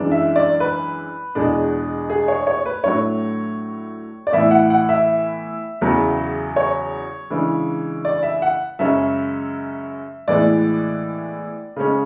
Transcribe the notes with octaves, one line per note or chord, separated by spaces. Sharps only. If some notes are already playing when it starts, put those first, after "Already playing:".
Already playing: F#2 E3 G#3 D4
E5
D5
B4
E2 B2 G#3 D4
G#4
C#5
C#5
B4
A2 F#3 A3 D4 C#5
D5
A2 E3 B3 E5
F#5
F#5
E5
E2 C#3 F#3 B3
C#5
C#3 E3 G#3 D4
D5
E5
F#5
F#2 C#3 G#3 C#4 E5
A2 E3 G#3 B3 D5
C#3 G#3 C#4